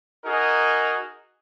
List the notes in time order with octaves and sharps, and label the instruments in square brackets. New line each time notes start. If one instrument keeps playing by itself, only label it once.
[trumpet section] D#4 F#4 G#4 A#4